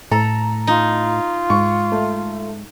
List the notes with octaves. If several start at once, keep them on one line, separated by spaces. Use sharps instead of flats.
A2 A4 A#5
D#4 F4
G#2 C#6
A3